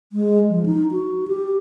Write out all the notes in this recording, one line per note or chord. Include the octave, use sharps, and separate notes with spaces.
G#3
F3
D#4
F#4
G4